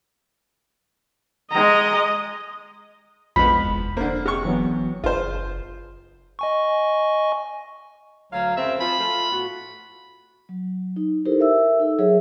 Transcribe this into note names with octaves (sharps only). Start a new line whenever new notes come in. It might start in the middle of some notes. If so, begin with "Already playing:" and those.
G#3 D#5 A#5
A#1 E2 F3 G#3 B3 B5
F1
D3 A#3 C5
C3 G#4 C#6
E3 F#3 B3
F#1 F4 G#4 C5
D#5 G#5 C#6
D2 F#3 F5
F#2 C#3 C4 E5
F3 F4 B5
A3 F4
A2 B3 F#4
F#3
D#4
D#4 E4 G4 A4 A#4 C5
A#4 E5 E6
D#4 A4
F#3 G#4 C#5 E5